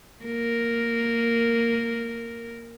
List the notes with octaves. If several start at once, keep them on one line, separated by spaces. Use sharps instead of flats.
A#3 A#4